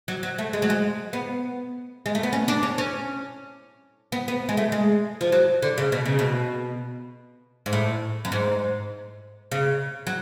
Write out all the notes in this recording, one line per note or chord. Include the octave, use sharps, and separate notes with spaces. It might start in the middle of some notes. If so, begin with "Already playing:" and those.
F#3
F#3
A3
G#3
F#3
G#3
B3
G#3
A3
B3
C#4
D4
C#4
C#4
B3
B3
G#3
A3
G#3
F3
F#3
D3
C#3
B2
C#3
B2
G#2
A2
F#2
G#2
C#3
F#3